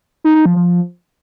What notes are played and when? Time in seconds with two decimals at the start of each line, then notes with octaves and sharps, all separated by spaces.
0.24 D#4
0.35 D#4
0.46 F3
0.56 F3